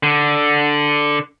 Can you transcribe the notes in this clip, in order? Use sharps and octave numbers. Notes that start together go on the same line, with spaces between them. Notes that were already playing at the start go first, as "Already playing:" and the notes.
D3